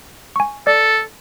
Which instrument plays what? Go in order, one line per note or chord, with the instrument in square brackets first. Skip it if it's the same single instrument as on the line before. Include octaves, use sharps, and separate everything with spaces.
[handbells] G#5 C#6
[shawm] A4 [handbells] D5